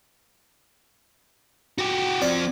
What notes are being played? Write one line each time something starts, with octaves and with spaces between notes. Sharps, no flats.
F#4 G4
F3 C4 D5